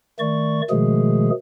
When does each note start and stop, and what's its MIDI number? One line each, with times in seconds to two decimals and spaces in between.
0.19 0.62 51
0.19 0.62 57
0.19 0.62 74
0.19 0.62 85
0.70 1.30 47
0.70 1.30 51
0.70 1.30 53
0.70 1.30 56
0.70 1.30 57
0.70 1.30 68